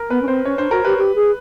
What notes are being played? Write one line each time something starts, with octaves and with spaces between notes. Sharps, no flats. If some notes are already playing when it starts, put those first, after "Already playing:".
Already playing: A#4
B3 B4
C#4
C4 C5
C#4 C#5
D4 C5
F#4 A#4
G4 B4
G4
G#4